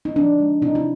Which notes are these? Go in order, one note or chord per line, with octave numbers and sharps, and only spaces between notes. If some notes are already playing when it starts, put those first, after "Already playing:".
D#4
F3 D4
G#3
C3 D#4
E4